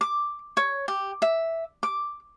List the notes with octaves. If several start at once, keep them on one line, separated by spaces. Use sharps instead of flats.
D6
C#5
G4
E5
D6